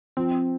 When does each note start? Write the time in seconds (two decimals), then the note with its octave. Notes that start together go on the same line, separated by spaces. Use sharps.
0.17 F3 C4